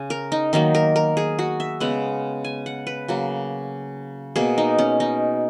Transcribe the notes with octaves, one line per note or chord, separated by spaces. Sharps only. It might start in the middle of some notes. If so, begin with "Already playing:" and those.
Already playing: C#3 G#5
A#4
D#4
D#3 F#3 A#3 D#4
A#4
A#4
G#4
F#4
E5
C#3 G#3 B3 F#5
G#5
F#5
B4
C#3 F#3 A#3
B2 A#3 G#4
D#4
C#4
D#4